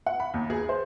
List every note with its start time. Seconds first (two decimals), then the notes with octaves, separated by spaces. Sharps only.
0.06 F#5
0.20 B5
0.34 D#2
0.50 G#4
0.69 C5